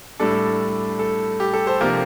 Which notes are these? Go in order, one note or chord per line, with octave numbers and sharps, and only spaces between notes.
A2 G3 D4 A4
A4
G4
A4
A4 C5
C3 F3 A#3 D4 G4 A#4